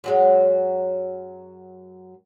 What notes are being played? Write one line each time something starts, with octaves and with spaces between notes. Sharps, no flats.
F#2 F#3 G#3